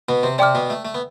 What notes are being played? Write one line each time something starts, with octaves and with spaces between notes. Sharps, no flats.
B2 B3
C3 C4
C3 C4 D5 G5 D6 F6
B2 B3
A3
A3
B3